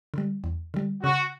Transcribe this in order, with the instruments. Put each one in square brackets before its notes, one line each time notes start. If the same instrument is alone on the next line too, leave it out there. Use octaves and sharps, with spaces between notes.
[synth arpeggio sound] D3 G3
E2
D3 G3
[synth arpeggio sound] C#3 [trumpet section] F#4